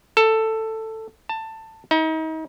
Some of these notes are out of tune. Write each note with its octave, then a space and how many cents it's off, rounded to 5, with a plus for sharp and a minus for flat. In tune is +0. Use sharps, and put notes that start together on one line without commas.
A4 +10
A5 +15
D#4 +35